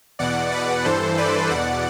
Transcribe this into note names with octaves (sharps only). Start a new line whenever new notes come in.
E2 B2 D5 F#5
B4 D5
G2 E3 A4 C5
B4 D5
E2 B2 D5 F#5